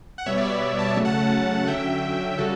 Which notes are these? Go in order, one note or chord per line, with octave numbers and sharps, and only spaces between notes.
F#5
B2 G3 B3 C#5 E5
D5
C#5 E5
A5
C#3 F#3 A3 C#4
F#5 A5
D3 F#3 C#4 E5 G5
C#3 G3 C#4 F#4 A4